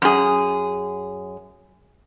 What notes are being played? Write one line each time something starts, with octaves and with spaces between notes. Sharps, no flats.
F#2 G#4